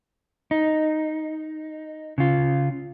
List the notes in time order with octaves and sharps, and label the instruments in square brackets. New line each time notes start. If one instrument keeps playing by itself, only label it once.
[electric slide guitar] D#4
C#3 F4